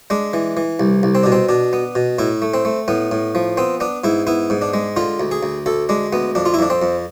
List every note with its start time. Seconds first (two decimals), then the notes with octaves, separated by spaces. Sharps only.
0.10 G#3 D4
0.33 E3
0.57 E3
0.80 C2
1.03 C2
1.15 C4
1.23 B2 D4
1.32 C4
1.49 B2 D4
1.73 B3
1.95 B2
2.19 A2 E4
2.42 A3
2.54 C4
2.65 A3
2.88 A2 B3
3.11 A2
3.35 F3
3.57 B3 C4
3.80 B3 D4
4.04 G#2 E4
4.27 B3 E4
4.50 G#2
4.62 D4
4.74 G#3
4.96 D3 F4
5.20 D2
5.31 G#4
5.43 D2
5.66 D2 A4
5.89 G#3 D4
6.13 D2 B3
6.35 F2 D4
6.46 F4
6.54 E4
6.59 F2 D4
6.70 C4
6.82 F2